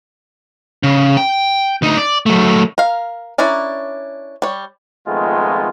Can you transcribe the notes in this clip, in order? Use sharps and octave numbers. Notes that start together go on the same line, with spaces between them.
C#3
G5
D2 D#4
D5
F#3 A3
A#4 F5
C#4 D4 E4 A#4 D5
G3 C#5
F2 D#3 G#3 A3 B3 F4